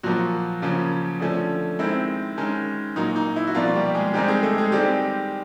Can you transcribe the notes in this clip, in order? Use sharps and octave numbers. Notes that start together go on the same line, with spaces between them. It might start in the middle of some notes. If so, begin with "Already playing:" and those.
A#2 F3 F#3 A#3 F#4
C#3 F3 A#3 C#4
D3 F3 A3 C#4
D#3 G#3 C4 E4
D#3 G#3 C#4
A#2 F#3 A#3 D#4
D#4
E4
F#4
B2 F3 G3 A#3 F4
G3 G4
G#3 G#4
D#3 G3 G#3 C4 D#4 G4
G#3 G#4
A3 A4
G#3 G#4
D#3 G3 G#3 C4 G4